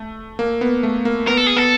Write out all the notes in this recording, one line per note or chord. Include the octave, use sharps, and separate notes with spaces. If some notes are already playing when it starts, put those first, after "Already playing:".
Already playing: A3
A#3
B3
A3
A#3
B3 A#4
A4
G#4
B3 A4